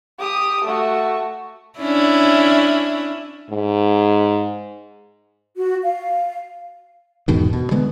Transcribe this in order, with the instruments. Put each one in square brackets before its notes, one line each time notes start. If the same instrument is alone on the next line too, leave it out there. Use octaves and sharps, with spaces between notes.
[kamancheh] G4 D#6
A3 F#4
[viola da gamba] C#4 D4 E4
[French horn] G#2
[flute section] F#4
F5
[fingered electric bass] E2 G#2 B2 D#3
B2
D3 G#3 B3